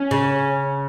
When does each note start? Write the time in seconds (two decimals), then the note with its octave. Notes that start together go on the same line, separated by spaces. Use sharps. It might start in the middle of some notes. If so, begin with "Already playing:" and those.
Already playing: C#4
0.11 C#3